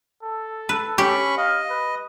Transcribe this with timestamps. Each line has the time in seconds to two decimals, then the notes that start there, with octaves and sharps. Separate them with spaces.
0.23 A4
0.69 B4
0.98 C#4 G4 B5 C#6
1.37 D#5 F5
1.70 B4